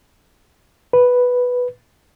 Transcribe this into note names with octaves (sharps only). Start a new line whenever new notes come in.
B4